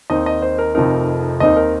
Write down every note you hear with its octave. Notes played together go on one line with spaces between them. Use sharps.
D#2 D#3 C4 D#4 D#5
D#5
C5
A#4
F1 F2 F3 C4 D#4 A#4
D#2 D#3 C4 D#4 D#5
A#4